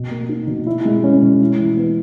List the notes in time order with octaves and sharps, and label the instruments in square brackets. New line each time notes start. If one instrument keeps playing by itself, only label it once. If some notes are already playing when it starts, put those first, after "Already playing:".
Already playing: [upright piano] B2
A#3
D#4
B2
E4
G#3
C#4
B2
E4
E3
B3